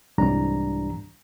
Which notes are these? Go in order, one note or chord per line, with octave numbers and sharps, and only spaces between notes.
C2 G#2 E3 G3 D4 A#5